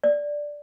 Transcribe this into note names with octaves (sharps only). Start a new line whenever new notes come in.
D5